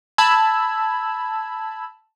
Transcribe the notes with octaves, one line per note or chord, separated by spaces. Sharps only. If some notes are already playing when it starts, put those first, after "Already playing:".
A5 B5 E6 G#6